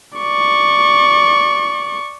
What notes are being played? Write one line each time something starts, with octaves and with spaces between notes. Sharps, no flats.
D5 C#6